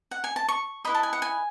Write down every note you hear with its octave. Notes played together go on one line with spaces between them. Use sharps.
F#5
G#5
A5
C#6
E4 B4 D#5 B5
A5
G#5
F#5
G#5